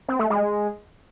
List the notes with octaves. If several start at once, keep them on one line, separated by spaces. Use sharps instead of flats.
C4
A3
G#3